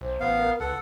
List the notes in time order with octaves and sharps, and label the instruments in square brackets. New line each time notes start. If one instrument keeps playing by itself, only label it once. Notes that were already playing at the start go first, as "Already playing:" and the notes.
[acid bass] B1 [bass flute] C5
[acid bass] A1 [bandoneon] B3 F5
[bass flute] A#4
[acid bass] C#2 [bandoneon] A4 F#5 [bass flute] B4